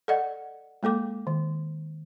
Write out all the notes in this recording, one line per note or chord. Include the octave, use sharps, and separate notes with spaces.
A4 D5 D#5 F#5
G#3 A#3 A4 D6
D#3